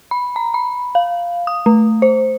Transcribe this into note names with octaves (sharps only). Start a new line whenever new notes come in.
B5
A#5
B5
F5
D#6
A3
C5